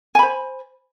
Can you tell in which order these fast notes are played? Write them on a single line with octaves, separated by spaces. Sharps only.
G#5 B5 C5